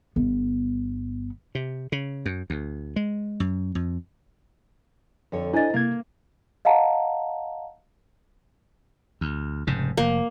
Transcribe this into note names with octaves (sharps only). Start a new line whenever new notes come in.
G1 B3
C3
C#3
F#2
D2
G#3
F#2
F2
F2 D3 C#5
D4 E4 C5 D#5 G#5 A6
C3 A#3 G#6
D#5 F5 F#5 A5 A#5
D2
F1 G#2 C#3
F1 A#3